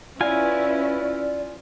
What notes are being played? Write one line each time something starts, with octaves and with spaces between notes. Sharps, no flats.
C#4 E4 F4 B4 D5 G#5